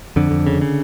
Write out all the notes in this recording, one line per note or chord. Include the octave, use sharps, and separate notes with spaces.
F2 D3
F2
C#3
C#3